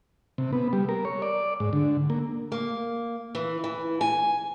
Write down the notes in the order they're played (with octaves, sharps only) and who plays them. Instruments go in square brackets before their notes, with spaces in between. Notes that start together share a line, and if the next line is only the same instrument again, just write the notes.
[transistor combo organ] C3
B3
G3
A#4
C#5
D5
G#2
D3
A#3
[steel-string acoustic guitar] A#3
E3
E3
G#5